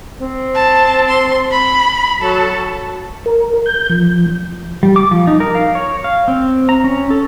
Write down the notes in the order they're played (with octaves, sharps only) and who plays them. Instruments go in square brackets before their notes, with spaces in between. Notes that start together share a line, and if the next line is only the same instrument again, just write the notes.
[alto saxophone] C4
[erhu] A5
C6
B5
[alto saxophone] F#3 [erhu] A4
[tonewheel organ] A#4
G6
F3
[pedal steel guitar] G3
D6
F3
D#4
A#4
F5
C#5
F5
C4
A#5
C#4
A4